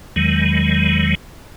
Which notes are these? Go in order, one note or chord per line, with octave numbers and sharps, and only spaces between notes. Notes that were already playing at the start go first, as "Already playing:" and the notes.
E2 D#3 F#3 G#3